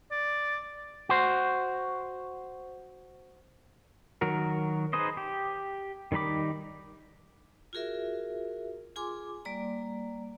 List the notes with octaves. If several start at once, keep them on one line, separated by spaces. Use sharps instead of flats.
D5
F#4 C5
D#3 F#3 F#4 A#4
D#4 G#4 B4 C5 D#5
G4
D#3 G3 D#4 B5 D6
F4 F#4 G#4 A#4 E5
F4 G#4 G#5 C6 D6
G3 A#3 D5 A#5